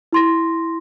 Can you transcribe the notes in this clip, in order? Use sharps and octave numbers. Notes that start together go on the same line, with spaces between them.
E4 C6 A#6